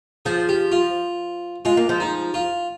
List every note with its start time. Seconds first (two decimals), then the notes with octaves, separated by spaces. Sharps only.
0.26 F3 G#4
0.49 G4
0.72 F4
1.65 G#3 F4
1.77 A#3
1.89 F3 G#3
2.00 D#4
2.34 F4